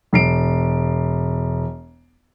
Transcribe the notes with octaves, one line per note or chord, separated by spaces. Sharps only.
E1 C7 D7